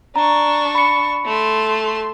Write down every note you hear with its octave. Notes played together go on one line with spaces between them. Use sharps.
D4 A#5 C#6
B5 C#7
A3 C6